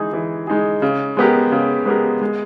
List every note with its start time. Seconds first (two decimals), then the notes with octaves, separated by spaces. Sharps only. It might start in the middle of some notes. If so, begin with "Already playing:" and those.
Already playing: E3 G#3 D#4 G#4
0.13 E3
0.47 G#3 D#4 G#4
0.82 C#3
1.17 G#3 B3 G4 A#4
1.52 C#3
1.86 G#3 B3 G4 A#4
2.21 G#3